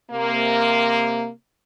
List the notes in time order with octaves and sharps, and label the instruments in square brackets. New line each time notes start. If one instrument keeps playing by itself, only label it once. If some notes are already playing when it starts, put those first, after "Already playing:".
[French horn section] C3 A#3